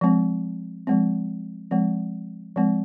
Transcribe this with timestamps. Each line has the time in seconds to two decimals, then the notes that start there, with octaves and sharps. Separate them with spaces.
0.01 F3 G#3 C4
0.87 F3 G#3 C4
1.71 F3 G#3 C4
2.56 F3 G#3 C4